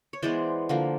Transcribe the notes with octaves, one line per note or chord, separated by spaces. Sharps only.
C#5
E3 G#3 B3 C5 D5
D3 F3 A#3